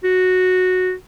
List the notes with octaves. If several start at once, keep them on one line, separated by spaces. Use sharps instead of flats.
F#4